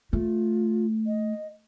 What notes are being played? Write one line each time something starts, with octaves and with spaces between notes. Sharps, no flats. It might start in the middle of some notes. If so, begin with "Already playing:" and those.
A3 F4
D#5